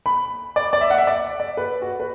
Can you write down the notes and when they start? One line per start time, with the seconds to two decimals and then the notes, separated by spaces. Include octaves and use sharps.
0.06 B5
0.56 D5
0.73 D5
0.81 E5
0.90 F#5
0.98 E5
1.07 D5
1.40 D5
1.57 B4
1.82 F#4
2.00 B4